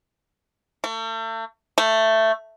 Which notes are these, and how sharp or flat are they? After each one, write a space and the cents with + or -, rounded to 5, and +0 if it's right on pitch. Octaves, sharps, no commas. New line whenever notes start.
A3 +40
A3 +10